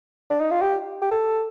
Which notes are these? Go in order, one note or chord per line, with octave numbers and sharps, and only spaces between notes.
D4
D#4
F4
G4
G4
A4